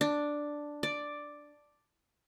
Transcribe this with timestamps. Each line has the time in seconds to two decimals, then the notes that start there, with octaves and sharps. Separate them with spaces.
0.01 D4
0.83 D5